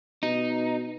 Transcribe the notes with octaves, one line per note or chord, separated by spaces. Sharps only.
B2 D#4